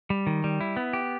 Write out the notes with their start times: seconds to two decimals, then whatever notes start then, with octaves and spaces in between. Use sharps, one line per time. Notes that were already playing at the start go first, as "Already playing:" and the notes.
0.10 G3
0.27 D#3
0.44 G3
0.61 E4
0.77 B3
0.93 G4